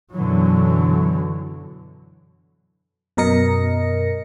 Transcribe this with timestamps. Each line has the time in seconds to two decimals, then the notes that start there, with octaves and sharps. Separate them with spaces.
0.13 F#2 B2 D3 E3 F#3
3.17 F#2 B2 A#4 D#5 A#6 C#7